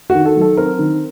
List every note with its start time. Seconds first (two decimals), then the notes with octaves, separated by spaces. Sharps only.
0.10 F#4
0.15 D#3
0.25 A4
0.36 F#3
0.41 A4
0.57 C4 A#4
0.79 D#3